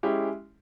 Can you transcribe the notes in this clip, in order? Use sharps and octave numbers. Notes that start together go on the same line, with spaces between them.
G#3 C#4 E4 G4